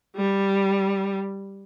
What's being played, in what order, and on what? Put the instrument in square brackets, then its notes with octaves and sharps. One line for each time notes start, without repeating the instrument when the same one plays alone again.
[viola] G3